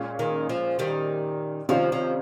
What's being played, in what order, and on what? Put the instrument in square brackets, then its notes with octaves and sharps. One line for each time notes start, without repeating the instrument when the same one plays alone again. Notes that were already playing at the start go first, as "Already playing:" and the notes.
Already playing: [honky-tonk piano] A#2 G#3 C#4 F4
[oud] D#3
F3
D#3 G3
[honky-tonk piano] C3 D#3 G3 C#4 F4 [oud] F3
[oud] F3